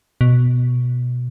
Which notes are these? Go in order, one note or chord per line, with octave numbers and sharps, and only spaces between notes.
B2